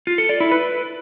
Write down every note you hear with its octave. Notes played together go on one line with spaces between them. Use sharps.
F4
A4
D5
E4
B4